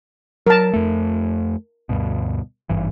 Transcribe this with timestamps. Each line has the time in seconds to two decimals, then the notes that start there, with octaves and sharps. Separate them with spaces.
0.47 F#3 A#4 A5
0.73 F2 A3
1.89 D2 G2 B2
2.69 G#1 G2 E3